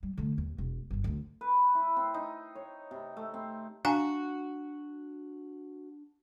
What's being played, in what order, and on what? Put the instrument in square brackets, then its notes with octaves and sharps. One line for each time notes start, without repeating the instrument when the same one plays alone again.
[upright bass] G3
D3 A3
D#2
E1
G1 F#2
D2 D3
[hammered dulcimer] B4
E4
C4
D#4
C#5
C3
A3
C4
[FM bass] D4 [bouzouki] F#4 [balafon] F5 G#5 A#5